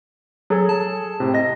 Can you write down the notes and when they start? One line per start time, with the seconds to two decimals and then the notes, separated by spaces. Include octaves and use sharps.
0.50 F#3 G#4 A4
0.69 A5
1.20 A2 C3
1.34 D#5 A#6